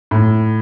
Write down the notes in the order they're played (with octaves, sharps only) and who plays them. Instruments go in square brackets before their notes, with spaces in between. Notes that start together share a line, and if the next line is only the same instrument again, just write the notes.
[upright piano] A2